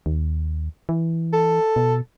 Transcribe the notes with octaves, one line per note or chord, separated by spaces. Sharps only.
D#2
E3
A4
B2